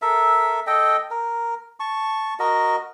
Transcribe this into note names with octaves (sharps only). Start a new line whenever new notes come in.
A4 A#4 E5
A4 D#5 G5
A#4
A5 C#6
F#4 A#4 D#5